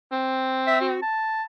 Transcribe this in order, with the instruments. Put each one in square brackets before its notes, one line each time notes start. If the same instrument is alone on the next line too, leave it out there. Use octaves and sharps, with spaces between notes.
[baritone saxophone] C4
[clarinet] E5
F#4
A5